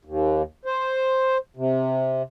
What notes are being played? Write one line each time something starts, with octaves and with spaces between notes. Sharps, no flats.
D#2
C5
C3